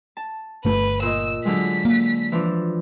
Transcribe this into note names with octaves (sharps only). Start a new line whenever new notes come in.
A5
G1 A3 B4
A#2 D#5 E6
D3 F#3 G#3 B6
A#3
E3 F3 D4